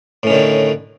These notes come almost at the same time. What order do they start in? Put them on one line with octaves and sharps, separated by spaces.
A2 C#4 D#3 D3